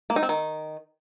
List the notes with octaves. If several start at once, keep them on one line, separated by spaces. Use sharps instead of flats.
A#3
D#4
C4
D#3